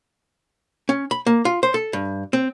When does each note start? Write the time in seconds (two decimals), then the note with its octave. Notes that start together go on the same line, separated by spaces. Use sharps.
0.89 C#4
1.11 B5
1.26 A#3
1.45 F4
1.63 C5
1.74 A4
1.93 G2
2.33 C4